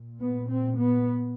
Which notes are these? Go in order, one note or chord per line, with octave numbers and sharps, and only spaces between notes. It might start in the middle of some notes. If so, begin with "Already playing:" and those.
Already playing: A#2
B3
C4
B3